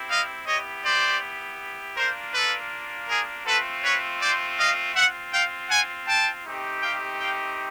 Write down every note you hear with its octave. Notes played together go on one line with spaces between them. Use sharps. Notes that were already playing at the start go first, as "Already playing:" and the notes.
Already playing: C4 E4 G4
D#5 F5
B3 E4 G4 C#5 D#5
C5 D5
A#3 D4 F4 A#4 C5
A4 B4
G#4 A#4
A3 C4 F4 A4 B4
B4 C#5
C5 D5
D#5 F5
C4 F4 E5 F#5
F5 G5
F#5 G#5
G5 A5
A3 C4 D#4 G4
F5 G5
F5 G5